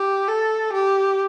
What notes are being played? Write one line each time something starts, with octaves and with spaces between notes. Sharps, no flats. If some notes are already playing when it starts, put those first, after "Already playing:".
Already playing: G4
A4
G4